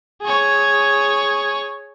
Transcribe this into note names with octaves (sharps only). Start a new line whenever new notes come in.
G#4 C#5